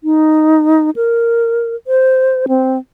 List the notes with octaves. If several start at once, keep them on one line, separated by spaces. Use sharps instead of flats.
D#4
A#4
C5
C4